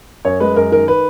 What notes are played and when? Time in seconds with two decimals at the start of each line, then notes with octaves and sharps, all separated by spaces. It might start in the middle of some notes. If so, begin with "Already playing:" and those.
0.25 F#2 C#5
0.40 G#3 B4
0.56 F#2 A#4
0.72 D#3 A#4
0.88 B4